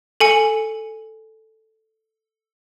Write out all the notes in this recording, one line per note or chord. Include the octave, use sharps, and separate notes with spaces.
A4 G#5 C#7